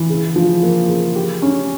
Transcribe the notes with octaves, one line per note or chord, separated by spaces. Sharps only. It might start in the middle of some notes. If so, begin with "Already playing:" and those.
Already playing: E3
C#3
F3
A#3
C#3
G4
C#4